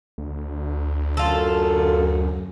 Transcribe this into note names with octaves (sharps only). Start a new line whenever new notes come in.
D2
F#2 F4 A4